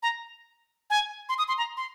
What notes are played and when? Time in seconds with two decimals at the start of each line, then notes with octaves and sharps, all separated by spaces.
0.03 A#5
0.90 G#5
1.29 C6
1.38 D#6
1.48 C6
1.58 A#5
1.77 C6